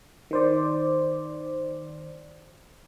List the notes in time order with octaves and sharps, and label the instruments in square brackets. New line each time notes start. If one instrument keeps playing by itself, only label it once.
[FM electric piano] D#3 C5 D5